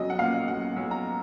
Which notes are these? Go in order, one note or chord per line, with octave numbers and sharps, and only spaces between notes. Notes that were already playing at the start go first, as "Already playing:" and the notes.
Already playing: B1 F#3 D#5
F#5
A#2 F5
B1 F#5
B1
A#5